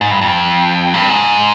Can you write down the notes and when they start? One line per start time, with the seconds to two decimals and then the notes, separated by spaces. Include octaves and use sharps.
0.01 G#2
0.11 G2
0.21 F2
0.94 G2
1.09 G#2